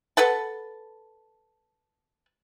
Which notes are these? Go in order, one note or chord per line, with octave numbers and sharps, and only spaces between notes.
A4 B4 F#5 A5